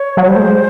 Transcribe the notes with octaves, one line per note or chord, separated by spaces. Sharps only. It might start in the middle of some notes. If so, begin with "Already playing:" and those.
Already playing: C#5
F#3
G3 C5
A3
G#3